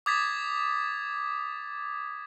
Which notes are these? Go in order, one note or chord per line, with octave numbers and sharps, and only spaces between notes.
D6 D#6 G#6 A6 B6